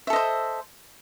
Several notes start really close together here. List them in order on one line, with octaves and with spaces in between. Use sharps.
E5 A4 D#5 C5